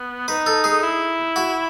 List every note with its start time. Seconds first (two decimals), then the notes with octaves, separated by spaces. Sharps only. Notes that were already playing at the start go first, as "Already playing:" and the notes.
Already playing: B3
0.28 D#4 B4
0.46 A4
0.64 G#4
0.83 E4
1.36 F#4